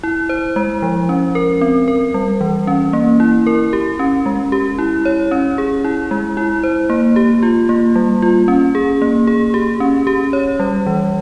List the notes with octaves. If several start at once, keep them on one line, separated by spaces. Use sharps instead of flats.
E4
C5
G#3
F3
C#4
A#4
C4
A#4
G3
E3
C#4
A#3
E4
A#4
G4
C#4
G#3
G4
E4
C#5
C#4
G#4
E4
G#3
E4
C5
A#3
G4
F4
A#3
G3
F4
C#4
G#4
A#3
G#4
G4
C#4
G4
C#5
G3
E3